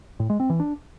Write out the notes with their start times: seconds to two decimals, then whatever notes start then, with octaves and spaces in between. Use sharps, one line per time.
0.20 A2
0.30 G#3
0.40 C4
0.50 E3
0.60 D4